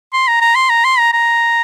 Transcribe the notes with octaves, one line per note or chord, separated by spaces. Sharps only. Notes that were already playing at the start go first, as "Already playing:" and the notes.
C6
A#5
A#5
C6
A#5
C6
A#5
A#5